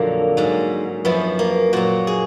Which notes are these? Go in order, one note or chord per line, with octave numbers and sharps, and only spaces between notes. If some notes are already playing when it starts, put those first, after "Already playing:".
Already playing: F2 A#2 D3 F#3 A#3
G#2 F#3
F#2 F3 B3
A#3
A#2 F#3 F#4
G#4